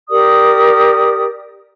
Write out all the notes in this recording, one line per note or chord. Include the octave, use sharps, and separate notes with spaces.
G4 A#4 D5 D#6